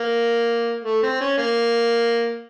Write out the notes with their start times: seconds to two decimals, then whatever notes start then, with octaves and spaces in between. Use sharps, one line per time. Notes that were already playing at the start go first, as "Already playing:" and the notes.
Already playing: A#3
0.85 A3
1.03 C4
1.21 C#4
1.38 A#3